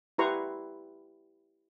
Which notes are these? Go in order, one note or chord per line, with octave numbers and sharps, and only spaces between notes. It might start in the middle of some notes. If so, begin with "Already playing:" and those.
E4 G4 B4 A#5 C6 C#6